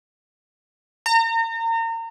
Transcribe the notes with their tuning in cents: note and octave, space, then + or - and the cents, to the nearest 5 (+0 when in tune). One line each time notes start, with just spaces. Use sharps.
A#5 -35